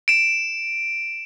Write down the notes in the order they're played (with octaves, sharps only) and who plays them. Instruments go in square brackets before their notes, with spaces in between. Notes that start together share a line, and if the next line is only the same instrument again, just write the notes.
[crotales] D7 E7